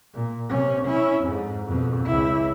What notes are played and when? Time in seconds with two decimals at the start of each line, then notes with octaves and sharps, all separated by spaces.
0.14 A#2
0.49 C3 C#4
0.84 C#4 E4
1.23 F2 G#2
1.67 F2 B2
2.06 C#2 E4